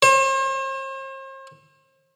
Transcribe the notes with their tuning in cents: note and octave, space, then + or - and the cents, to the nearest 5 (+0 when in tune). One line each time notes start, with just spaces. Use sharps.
C5 +45